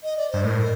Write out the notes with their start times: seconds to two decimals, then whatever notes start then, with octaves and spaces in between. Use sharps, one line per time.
0.03 D#5
0.16 D5
0.30 G2 C5
0.44 A2 A#4